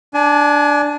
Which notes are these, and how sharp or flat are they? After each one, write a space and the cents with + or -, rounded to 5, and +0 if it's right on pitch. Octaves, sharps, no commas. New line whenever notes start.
D4 +0 G#5 +35